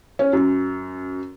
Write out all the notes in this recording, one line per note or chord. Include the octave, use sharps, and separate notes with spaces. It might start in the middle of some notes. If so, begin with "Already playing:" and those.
C#4
F#2